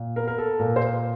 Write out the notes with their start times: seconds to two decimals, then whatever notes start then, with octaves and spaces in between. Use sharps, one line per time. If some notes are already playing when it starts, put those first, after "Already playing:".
Already playing: A#2
0.16 B3 A#4
0.28 A#4
0.38 A4
0.59 A#2 A#4
0.76 C5
0.81 B4